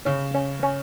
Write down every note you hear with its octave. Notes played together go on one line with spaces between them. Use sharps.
C#3 C#4
C#4
C#4